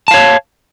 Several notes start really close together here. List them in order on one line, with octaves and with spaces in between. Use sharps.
A5 F5 C#5